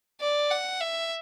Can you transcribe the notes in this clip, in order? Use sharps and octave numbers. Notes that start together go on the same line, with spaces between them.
D5
F#5
E5